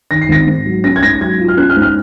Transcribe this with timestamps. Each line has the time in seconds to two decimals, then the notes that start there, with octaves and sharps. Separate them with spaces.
0.10 D#3 A#6
0.22 C7
0.29 G#1 A#6
0.47 G#2
0.66 F#3
0.84 C#4 A#6
0.96 G#6
1.03 G#2 A#6
1.20 F#3 G#6
1.40 F4
1.48 F6
1.57 C#4 F#6
1.70 F6
1.76 G#2
1.82 F6